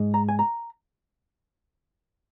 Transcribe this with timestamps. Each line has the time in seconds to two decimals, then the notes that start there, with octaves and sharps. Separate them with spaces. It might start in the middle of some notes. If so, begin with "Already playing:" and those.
Already playing: G#2 G#3
0.14 A#5
0.29 G#5
0.39 A#5